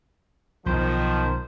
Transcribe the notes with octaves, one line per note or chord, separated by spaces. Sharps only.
B1 D#3 F3 C5